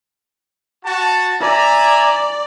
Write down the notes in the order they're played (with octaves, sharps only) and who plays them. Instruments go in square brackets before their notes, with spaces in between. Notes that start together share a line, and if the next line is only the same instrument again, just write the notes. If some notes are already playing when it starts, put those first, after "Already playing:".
[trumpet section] F#4 A5
[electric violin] D5 [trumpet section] E5 G#5 A#5